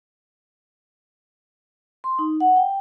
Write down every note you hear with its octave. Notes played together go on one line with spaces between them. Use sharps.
C6
D#4
F#5
G5